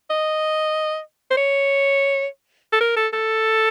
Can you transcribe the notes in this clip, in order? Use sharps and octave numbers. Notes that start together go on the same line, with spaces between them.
D#5
C5
C#5
A4
A#4
A4
A4